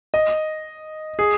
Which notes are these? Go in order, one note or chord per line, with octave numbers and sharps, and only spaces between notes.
D#5
G#4